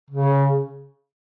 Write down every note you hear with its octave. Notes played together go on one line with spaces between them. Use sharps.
C#3